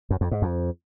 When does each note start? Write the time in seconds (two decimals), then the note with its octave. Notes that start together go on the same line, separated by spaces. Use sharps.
0.10 F#2
0.21 F2
0.31 G#2
0.42 F2